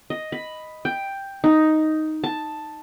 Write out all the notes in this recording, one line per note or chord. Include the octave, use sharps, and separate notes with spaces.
D#5
B5
G5
D#4
A5